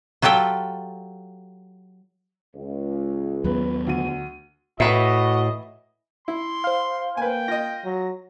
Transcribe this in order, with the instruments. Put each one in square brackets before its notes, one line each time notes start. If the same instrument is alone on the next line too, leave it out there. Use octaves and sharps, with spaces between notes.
[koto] F#3 F4 G4 A4 G5
[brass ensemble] C#2
[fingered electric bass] D#2 F#3 B3 [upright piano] B4
[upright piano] D2 D#7
[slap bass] A2 [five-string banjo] E3 B4 E5 [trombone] F#4 [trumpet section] D#5
[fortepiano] E4 [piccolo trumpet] C6
[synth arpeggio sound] C5 F5
[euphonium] A#3 [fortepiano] B4 G#5 [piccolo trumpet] G5
[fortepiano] F4 D#5 [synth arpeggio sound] A#6
[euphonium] F#3